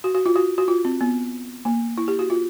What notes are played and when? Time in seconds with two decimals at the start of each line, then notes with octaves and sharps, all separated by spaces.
0.04 F#4
0.15 F#4
0.26 F4
0.36 F#4
0.58 F#4
0.68 F4
0.85 C4
1.01 B3
1.65 A#3
1.98 E4
2.08 G4
2.19 F#4
2.30 F4